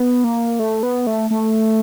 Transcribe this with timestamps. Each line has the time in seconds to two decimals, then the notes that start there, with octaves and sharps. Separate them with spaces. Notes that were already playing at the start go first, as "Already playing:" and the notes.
Already playing: B3
0.24 A#3
0.59 A3
0.83 B3
1.07 A3
1.30 A3